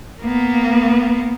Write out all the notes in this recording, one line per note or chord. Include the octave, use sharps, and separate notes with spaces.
A#3 B3